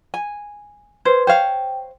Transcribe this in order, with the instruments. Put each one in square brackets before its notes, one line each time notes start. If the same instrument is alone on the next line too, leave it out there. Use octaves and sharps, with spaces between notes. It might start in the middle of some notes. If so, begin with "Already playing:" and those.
[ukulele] G#5
[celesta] B4 C6 G#6 [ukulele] C5
[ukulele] C5 C#5 F5 [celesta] G5